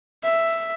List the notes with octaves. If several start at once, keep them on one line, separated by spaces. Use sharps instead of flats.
E5